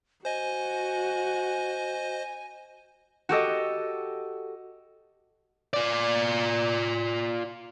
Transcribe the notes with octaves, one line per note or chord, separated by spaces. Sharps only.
F#4 C5 D#5 G#5
F#4 G4 A4 D#5
F4 D5